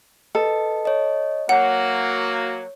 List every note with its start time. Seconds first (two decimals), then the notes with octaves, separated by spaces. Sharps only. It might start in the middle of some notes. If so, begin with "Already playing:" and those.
0.35 A4 B4 D#5
0.85 C#5 D#5
1.49 F#3 A#3 F#4 C#5 F#5